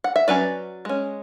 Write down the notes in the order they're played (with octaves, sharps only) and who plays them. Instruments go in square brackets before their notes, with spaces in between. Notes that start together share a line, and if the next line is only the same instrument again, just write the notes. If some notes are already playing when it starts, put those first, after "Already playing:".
[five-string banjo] F#5
E5
F#3 C#4 B4 D5
G#3 C#4